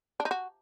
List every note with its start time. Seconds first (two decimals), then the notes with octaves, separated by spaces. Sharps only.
0.20 D4
0.25 D#4
0.31 F#4